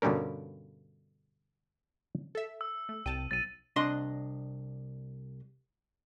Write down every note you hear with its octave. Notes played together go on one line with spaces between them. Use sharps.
G2 B2 D3 G3 C#4 A#4
A4 E5
E6
A3
C2 G5 A5 D#7
B1 A6 D#7
C2 D4 D#5 C6